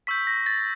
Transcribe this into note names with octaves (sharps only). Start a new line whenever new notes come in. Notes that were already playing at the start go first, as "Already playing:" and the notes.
C#6 E6 G6 B6
A#6
A6